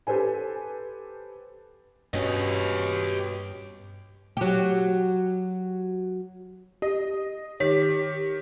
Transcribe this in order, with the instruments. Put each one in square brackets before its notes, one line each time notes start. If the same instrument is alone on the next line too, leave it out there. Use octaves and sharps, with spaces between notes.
[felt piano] G4 A4 B4 C5 G#5
[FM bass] G2 [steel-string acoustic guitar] B2 C#4 [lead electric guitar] G4 D#5
[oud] F#3 G4
[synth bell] G4 [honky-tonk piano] D#5
[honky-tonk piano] D#3 B6 [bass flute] G4 [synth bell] C#5